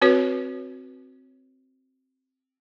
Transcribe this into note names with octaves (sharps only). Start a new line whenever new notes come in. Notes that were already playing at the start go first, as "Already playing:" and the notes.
C4 F#4 B4 C#5